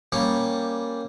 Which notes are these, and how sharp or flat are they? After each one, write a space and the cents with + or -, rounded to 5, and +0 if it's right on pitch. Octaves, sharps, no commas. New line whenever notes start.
G3 +0 A#3 +0 C#4 +0